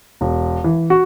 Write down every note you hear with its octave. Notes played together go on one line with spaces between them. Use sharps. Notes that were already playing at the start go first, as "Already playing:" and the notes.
E1
E3
F#4